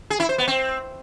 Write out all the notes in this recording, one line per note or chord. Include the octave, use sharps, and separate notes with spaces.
G#4
E4
C5
B3
C4